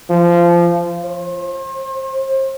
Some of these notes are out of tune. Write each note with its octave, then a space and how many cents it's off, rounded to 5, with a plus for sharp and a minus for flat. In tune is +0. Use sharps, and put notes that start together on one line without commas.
F3 -20
C5 +40